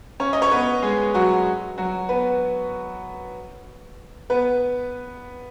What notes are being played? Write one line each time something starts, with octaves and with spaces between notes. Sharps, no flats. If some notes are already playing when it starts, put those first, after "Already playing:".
C#4 C#5
D#5
C#5
B3 B4
G#3 G#4
F#3 F#4
F#3 F#4
B3 B4
B3 B4